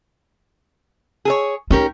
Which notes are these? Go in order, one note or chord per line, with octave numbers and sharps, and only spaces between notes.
G#4 A4 C#5
C#4 D#4 G4 A#4